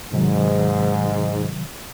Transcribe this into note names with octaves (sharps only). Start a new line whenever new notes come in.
G#2 C3 D#3 F#3